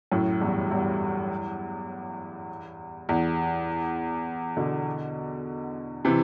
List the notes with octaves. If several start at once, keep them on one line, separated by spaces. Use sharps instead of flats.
F#2 A2
E2 G2
E2 G2
E2
B2 D3
C3 E3